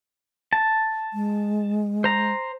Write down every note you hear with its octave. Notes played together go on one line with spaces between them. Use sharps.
A5
G#3
C5 A#5